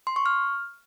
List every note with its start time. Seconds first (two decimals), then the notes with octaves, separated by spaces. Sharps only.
0.07 C6
0.16 C#6
0.26 F6